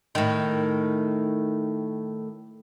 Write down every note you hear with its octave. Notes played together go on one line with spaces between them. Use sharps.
A2 D#3